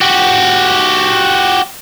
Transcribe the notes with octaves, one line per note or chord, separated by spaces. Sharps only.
F#4 G4